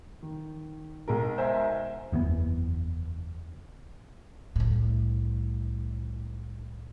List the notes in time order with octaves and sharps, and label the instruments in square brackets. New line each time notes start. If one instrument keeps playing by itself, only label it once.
[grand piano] D#3
[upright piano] B1 G#3 A#4
[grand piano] C5 E5 G#5
[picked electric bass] F#1 E2 C#3 B3
[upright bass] C2 A2